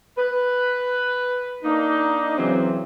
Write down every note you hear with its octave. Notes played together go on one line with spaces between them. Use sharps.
B4
A#3 D4 D#4
C#3 E3 F#3 C4